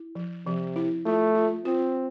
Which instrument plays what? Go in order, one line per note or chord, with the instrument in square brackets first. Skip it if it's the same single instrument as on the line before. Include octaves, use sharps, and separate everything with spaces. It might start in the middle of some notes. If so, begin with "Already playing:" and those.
Already playing: [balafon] E4
F3
[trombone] C3 [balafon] F3
[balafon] E4
[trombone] A3 [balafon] F4
[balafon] F4
[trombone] C4 [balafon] F4